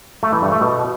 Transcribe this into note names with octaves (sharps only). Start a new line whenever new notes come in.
A3
E3
G2
A3
B2